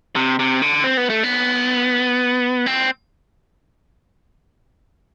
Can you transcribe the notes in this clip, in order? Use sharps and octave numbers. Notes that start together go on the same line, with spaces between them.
C3
C3
D3
C4
B3
A3
B3
C4